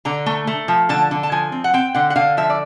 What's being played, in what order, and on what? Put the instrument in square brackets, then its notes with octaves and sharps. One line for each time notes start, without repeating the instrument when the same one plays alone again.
[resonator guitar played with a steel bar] D3 A#5
A3
A3
F3
D3 A5
D3
A5
F3 G#5
C4
F#5
C4 G5
D3 F#5
F#5
D3 F5
F3 E5
D5